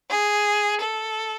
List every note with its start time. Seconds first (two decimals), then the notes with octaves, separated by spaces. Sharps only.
0.10 G#4
0.81 A4